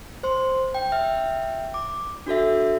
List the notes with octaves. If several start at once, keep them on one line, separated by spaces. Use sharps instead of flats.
C5 C6
G5
E5 G5 F6
D6
D4 F#4 A4 E5